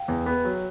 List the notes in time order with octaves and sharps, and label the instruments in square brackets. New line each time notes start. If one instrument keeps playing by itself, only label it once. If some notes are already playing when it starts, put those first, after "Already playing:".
Already playing: [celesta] F5 G5
[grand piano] E2
B3
F#3